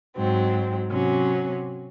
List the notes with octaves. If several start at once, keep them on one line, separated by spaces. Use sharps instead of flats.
G#2 F#3 C4
C3 F#3 C#4